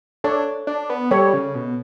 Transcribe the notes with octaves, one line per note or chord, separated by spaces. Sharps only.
D4 A4 C#5
D4
B3
G3 A4 C#5
C#3
B2